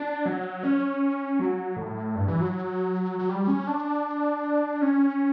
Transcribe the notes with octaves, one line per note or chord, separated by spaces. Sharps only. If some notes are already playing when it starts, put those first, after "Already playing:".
Already playing: D4
F#3
C#4
F#3
A2
G2
E3
F#3
F#3
G3
C#4
D4
C#4